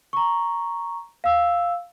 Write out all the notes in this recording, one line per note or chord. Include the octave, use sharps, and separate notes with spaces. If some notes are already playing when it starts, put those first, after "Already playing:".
A#5 C#6
F5 E6